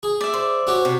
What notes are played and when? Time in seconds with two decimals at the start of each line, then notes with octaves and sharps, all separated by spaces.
0.03 G#4
0.21 D5 E5
0.34 C5
0.67 C#4 F#4 G4
0.85 C3